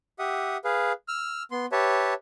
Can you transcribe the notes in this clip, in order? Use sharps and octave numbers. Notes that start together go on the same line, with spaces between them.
G4 E5 F#5 D#6
G#4 B4 F5
E6 F6
B3 C6
G4 B4 C#5 E5 A5